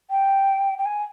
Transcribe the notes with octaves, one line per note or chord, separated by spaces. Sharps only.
G5
G5
G#5